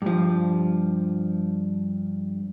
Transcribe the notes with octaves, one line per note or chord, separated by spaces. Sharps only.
G2 F3